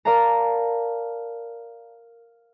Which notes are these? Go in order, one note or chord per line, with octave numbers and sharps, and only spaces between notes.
A#4 D5 F5 A5 A#5